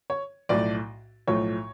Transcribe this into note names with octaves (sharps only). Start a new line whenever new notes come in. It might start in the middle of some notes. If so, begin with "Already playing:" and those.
C#5
B1 A2 F3 A3 D5
B1 A2 F3 A3 C#5